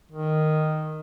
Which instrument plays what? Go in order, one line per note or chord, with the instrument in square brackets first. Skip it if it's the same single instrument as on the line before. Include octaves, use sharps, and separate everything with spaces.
[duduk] D#3